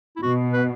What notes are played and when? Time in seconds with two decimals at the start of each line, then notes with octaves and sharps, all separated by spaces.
0.16 E4
0.22 B2 F#4
0.53 B4